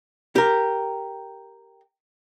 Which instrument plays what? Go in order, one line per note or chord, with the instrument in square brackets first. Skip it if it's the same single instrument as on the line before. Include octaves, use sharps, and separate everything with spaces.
[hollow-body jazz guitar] G4 A#4